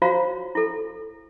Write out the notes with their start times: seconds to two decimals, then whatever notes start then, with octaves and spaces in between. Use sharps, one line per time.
0.02 F4 F#4 C5 C#5 F5 A#5
0.55 E4 A4